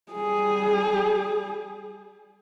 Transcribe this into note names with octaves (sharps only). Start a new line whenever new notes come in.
G3 G#4